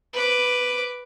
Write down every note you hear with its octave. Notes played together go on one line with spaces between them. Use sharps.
B4 D6